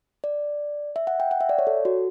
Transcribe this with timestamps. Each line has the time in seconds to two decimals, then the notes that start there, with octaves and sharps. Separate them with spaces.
0.24 D5
0.96 E5
1.07 F#5
1.20 G5
1.31 F#5
1.41 E5
1.49 D5
1.59 C#5
1.67 A4
1.85 F#4